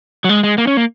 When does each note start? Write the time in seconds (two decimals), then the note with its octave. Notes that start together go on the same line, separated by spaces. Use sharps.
0.24 F#3
0.29 G#3
0.43 G#3
0.58 A#3
0.67 C#4
0.77 A#3